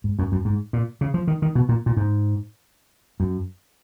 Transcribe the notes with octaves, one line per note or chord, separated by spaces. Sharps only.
G#2
F#2
F#2
G#2
A#2
C#3
F3
D#3
D#3
B2
A#2
A#2
G#2
F#2